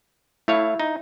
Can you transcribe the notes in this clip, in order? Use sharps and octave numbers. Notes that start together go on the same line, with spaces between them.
A3 E4 C#5 F5
D#4